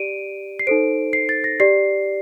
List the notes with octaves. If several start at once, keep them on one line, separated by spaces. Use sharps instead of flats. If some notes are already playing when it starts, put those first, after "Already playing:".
Already playing: G4 D5 D7 D#7
C7
D#4 A4 C5 D7
C7
A6
A#6
G4 D5 C7